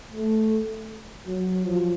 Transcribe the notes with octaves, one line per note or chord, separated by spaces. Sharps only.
A3
F#3
F3